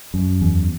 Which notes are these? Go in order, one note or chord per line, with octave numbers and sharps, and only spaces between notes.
F#2
E2